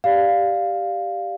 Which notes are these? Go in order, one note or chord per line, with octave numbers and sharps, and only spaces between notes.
G4 D5 F5